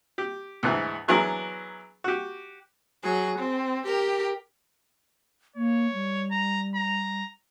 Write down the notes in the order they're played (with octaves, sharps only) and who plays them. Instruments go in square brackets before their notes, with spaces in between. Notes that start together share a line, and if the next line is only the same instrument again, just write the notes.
[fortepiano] G4
D2 G#2 E3
E3 F#3 B3 D4 G#4 A#4
F#4 G4
[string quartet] F#3 G#4
C4
G4 A#4
[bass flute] A#3 [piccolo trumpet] C#5
[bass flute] G3
[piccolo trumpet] A#5
A#5